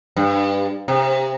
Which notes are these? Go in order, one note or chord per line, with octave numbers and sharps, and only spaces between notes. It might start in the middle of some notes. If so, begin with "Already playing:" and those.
G2
C3